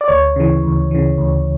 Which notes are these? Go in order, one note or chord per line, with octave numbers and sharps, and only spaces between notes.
D5
D2 C#5
C#3 E3
D2
C#3 E3
D2